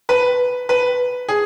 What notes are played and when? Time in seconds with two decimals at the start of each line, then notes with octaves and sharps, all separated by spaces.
0.09 B4
0.69 B4
1.28 G#4